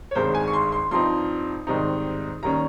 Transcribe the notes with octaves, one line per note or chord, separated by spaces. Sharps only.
C#5
G#1 G2 D#3 G#3 C5
G#5
C#6
C6
C6
G2 F3 C4 D#4 C6
G#2 D#3 G3 C4 D#4
D#2 D#3 G3 C#4 A#5